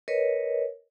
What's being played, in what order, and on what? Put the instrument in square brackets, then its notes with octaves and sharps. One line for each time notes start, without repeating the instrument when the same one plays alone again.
[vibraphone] A#4 B4 C#5 D#5